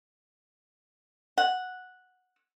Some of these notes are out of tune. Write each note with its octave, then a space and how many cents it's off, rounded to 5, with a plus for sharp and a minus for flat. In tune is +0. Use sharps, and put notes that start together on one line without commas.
F#5 -5